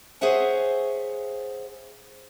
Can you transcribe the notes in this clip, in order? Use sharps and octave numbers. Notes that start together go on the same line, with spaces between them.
G#4 C5 C#5 E5 F#5 G#5